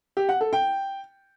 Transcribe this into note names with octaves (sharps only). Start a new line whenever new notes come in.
G4
F#5
A4
G5